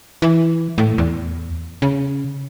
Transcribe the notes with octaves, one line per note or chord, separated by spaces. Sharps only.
E3
A2
E2
C#3